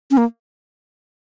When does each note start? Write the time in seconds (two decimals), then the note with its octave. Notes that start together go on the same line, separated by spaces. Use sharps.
0.11 C#4
0.17 A#3